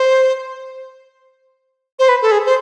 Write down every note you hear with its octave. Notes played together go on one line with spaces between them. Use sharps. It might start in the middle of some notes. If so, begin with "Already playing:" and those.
Already playing: C5
C5
B4
A4
G#4
C5